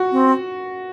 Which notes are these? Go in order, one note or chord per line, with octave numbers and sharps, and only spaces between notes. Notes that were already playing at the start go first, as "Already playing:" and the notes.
Already playing: F#4
C4